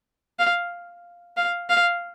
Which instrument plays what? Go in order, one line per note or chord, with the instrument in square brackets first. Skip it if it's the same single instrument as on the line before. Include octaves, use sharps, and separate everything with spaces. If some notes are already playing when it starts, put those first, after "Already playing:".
[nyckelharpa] F5
F5
F5